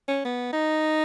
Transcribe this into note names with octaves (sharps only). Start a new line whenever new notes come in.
C#4
B3
D#4